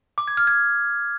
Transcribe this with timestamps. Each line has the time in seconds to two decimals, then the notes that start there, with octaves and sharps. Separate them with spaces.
0.18 D6
0.28 G#6
0.37 F6
0.47 G#6